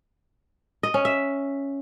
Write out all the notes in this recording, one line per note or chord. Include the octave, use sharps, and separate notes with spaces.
D#5
C#4
E5